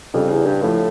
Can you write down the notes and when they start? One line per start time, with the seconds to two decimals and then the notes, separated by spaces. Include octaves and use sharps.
0.13 F2 C#3 G3 D4
0.30 E2
0.45 G2
0.62 A2 F3 A3 E4